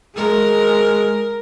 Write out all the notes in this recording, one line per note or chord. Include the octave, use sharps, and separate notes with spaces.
G#3 A#4